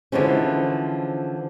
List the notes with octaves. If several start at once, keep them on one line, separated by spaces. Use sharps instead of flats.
D3 E3 F3 G#3 C#4